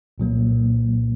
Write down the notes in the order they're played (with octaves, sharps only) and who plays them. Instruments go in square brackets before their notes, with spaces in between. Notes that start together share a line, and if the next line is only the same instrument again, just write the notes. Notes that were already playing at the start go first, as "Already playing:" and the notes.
[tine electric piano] C2 A#2 F#3 A#3